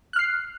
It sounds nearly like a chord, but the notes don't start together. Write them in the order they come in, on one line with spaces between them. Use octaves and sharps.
F#6 F6 C7